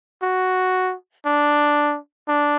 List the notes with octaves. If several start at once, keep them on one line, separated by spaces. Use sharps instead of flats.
F#4
D4
D4